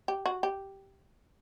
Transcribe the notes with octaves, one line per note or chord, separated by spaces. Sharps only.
G4
F#4
G4